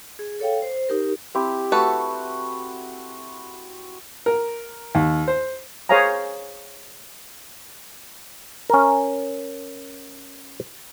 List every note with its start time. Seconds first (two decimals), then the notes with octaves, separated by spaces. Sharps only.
0.19 G#4
0.40 A4 C#5 F5 G5
0.62 C5
0.89 D#4 G4 A#4
1.35 C4 E4 G4
1.72 A3 F#4 A4 B4
4.26 A#4
4.95 D#2
5.28 C5
5.89 G#4 C5 C#5 F5 G#5 A#5
8.70 C#4 A#4